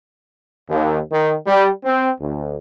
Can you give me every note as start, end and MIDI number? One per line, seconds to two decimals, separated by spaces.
0.69 0.99 39
1.11 1.34 51
1.47 1.69 55
1.84 2.10 60
2.20 2.55 38